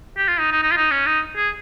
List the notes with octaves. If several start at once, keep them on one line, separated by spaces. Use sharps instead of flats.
G4
F4
D#4
D#4
D#4
F4
D#4
C#4
D#4
G#4